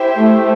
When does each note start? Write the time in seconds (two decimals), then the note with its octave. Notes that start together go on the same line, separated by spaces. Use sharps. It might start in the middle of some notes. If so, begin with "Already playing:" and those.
Already playing: E4 G4 C5 E5 G5
0.17 A3